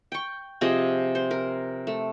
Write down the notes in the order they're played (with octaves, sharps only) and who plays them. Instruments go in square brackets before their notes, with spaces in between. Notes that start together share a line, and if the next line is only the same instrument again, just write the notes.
[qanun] G5 C#6
C3 F3 G#4 D#5
C5
A#4
A3